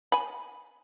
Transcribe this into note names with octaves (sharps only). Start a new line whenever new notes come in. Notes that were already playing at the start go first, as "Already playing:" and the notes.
G#5 B5